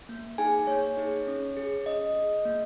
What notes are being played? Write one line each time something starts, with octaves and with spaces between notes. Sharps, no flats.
A#3
D#4 G#4 G#5
A#3 C#5
D#4 G#4
C#4
G#4
C#4 D#5
G#4
A#3